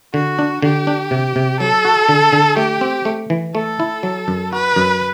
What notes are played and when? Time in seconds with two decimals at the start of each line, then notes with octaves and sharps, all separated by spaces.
0.14 D3 F#4
0.39 D4
0.62 D3 G4
0.87 D4
1.11 C3
1.36 C3
1.60 F#3 A4
1.85 F#4
2.09 D3
2.32 D3
2.57 A3 G4
2.81 C4
3.05 A3
3.30 E3
3.55 A3 A4
3.80 E4
4.03 F#3
4.28 F#2
4.52 F#4 B4
4.76 F#2